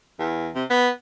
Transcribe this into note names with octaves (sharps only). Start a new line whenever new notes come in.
E2
C3
B3